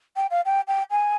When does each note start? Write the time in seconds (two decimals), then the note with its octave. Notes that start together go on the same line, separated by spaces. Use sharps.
0.16 G5
0.30 F5
0.45 G5
0.67 G5
0.91 G#5